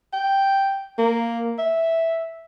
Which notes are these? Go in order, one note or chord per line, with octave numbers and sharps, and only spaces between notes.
G5
A#3
E5